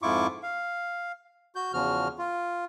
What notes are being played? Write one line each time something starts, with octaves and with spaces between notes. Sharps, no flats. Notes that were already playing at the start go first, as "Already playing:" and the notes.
F2 G#2 E4 F4 C#6 D6
F5
F#4 G6
E2 C#3 F3 F#4 F6
F4